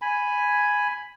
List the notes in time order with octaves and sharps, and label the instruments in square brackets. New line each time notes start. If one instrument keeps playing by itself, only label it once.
[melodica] G#5 B5